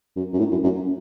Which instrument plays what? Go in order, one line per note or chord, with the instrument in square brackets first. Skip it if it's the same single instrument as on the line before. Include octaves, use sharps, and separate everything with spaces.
[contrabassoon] F#2
F#2
A2
F#2
F#2